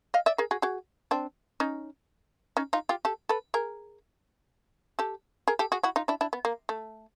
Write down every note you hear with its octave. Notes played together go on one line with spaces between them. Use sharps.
D#5 F5
D5 E5
G#4 A#4
F#4 G#4
F#4 G#4
C4 D4
C#4 D#4
C#4 D#4
D#4 F4
F4 G4
G4 A4
A4 B4
G#4 A#4
G4 A4
G#4 A#4
G4 A4
F#4 G#4
E4 F#4
D#4 F4
D4 E4
D4 E4
B3
A#3
A3